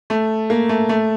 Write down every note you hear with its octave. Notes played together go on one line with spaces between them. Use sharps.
A3
A#3
A3
A3